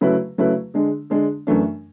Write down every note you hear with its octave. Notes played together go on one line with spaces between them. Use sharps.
C#3 F#3 A3 E4 B4
C#3 F#3 A3 E4 B4
D3 G#3 D4
D3 G#3 D4
F#2 E3 A3 D4